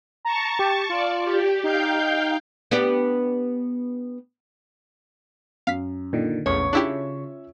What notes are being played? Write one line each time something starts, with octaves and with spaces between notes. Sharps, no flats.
A5 A#5 C#6
G4
F4 D5
G4
D#4 F5 G5 G6
B3 D4 G4
F#2 F5 B6
A#2 D3 D#3
A#1 E2 A2 C#3 B3 C#5
C#3 C#4 D4 E4 F4 G4 E5